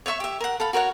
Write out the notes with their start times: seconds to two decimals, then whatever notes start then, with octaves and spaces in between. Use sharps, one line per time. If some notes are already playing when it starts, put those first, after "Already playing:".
0.06 C#5 D5 E5 C#6
0.20 G4 E5
0.41 A#4 F#5
0.60 A4 F5 B5
0.73 F#4 A#4 C#5 F#5